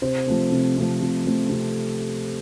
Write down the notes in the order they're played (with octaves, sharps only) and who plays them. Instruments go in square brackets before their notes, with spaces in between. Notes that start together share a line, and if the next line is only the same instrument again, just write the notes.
[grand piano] C3 C5
F3 A3 C4
C3
F3 A3 C4
C3
F3 A3 C4
C3